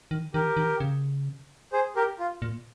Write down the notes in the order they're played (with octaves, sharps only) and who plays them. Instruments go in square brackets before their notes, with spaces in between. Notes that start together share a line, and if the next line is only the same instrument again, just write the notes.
[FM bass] D#3
[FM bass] D#3 [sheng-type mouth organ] G4 A#4
[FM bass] D#3
C#3
[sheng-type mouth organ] G#4 C5
G4 A#4
F4
[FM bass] A#2